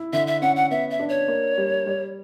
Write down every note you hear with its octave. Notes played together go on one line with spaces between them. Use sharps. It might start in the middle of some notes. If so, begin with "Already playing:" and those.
Already playing: E4
D3 E5
E5
C#4 F#5
F#5
B3 E5
E5
D4
C#5
A#3
G3
G3